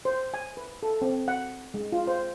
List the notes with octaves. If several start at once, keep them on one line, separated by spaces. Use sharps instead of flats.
C5
G#5
B4
A4
C4
F#5
G#3
F4
C5